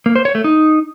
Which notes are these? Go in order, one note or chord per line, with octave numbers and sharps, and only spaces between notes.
A#3
C5
C#5
A3
D#4